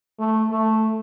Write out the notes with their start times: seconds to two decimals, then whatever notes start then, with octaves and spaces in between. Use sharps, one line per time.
0.19 A3
0.51 A3